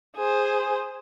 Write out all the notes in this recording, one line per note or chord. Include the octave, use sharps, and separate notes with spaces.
G#4 C5